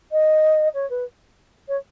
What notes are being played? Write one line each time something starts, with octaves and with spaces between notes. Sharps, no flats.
D#5
C#5
B4
C#5